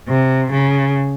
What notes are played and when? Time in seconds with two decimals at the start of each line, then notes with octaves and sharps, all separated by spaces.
0.08 C3
0.52 C#3